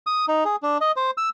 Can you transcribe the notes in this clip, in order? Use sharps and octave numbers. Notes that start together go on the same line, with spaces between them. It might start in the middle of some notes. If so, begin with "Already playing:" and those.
D#6
D#4
G#4
D4
D#5
C5
E6